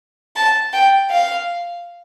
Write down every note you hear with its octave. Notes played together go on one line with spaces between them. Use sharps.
A5
G5
F5